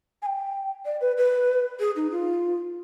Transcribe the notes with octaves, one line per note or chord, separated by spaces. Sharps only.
G#5
G5
D5
B4
B4
G#4
D#4
F4